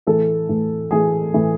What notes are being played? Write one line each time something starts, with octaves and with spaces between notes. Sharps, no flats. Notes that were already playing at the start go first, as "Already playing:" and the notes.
A2 E3 A3 A4
A2 E3 A3
A2 E3 A3 G#4
A2 E3 A3